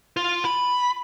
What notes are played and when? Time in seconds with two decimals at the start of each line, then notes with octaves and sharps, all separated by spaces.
0.17 F4
0.45 B5